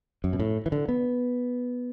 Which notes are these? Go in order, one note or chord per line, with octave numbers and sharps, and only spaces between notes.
F#2
B2
A2
E3
D3
B3